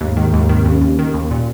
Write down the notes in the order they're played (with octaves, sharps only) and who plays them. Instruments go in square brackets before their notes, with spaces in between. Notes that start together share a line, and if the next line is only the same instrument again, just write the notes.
[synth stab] D#2 [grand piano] G#2
[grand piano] G#2 [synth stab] D#3
[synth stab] D#2 [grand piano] G#2
[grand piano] C3 [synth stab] D#3
[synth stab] D#2 [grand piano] C#3
[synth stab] D#2
D#3
D#2
A#2